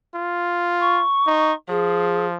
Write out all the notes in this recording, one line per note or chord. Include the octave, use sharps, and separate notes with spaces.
F4
C#6
D#4
F3 G#4